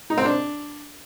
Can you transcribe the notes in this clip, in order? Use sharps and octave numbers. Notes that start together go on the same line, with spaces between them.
D#4
C4
D4